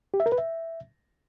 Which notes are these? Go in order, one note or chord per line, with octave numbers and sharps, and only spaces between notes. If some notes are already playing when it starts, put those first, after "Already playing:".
G4
E5
A#4
B4
E5